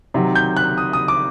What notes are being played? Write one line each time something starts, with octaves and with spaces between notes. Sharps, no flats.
C3 D#3 F#3
G6
F#6
D#6
D#6
D6